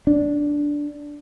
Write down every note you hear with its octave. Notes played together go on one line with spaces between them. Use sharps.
D4